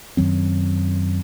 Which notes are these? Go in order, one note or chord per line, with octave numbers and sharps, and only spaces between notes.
F#2 D#3 F#3 C4